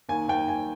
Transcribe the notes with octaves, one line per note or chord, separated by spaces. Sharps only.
D#2 G#5
D#2 G5
D#2 G#5